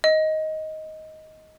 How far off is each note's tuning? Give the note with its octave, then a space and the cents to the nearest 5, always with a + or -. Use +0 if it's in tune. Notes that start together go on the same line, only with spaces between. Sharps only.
D#5 +10